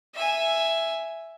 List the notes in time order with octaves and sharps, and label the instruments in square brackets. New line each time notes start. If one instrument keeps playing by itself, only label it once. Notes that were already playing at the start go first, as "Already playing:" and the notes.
[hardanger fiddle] E5 G#5